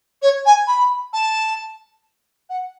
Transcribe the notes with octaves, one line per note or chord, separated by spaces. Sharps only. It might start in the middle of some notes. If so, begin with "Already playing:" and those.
C#5
G#5
B5
A5
F#5